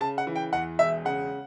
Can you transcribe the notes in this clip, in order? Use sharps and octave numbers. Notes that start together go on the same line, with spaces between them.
C#3 A5
F#5
E3
G5
E2 F#5
E1 E5
C#3 F#5